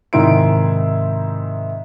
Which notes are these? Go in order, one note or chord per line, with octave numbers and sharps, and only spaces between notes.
G#2 C3 D#3 E4 C6 D7